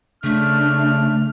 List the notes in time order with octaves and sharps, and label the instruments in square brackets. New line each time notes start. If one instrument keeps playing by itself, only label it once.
[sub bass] C#3 [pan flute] A3 [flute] D4 [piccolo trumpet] F6